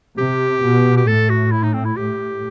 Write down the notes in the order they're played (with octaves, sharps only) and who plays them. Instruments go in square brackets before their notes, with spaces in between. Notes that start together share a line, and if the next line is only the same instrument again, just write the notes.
[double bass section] C3 [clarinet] G4
[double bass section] B2
[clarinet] G4
[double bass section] A2 [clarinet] A4
[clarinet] F#4
E4
D#4
C4
E4
[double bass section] A2 [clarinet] G4